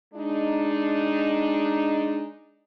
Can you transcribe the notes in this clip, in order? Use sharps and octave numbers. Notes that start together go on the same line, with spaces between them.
G#3 D4 D#4